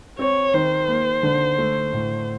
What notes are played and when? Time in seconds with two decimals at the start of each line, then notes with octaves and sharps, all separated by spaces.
0.19 C4 C#5
0.54 D#3 C5
0.88 A#3
1.23 D3
1.58 A3
1.93 A2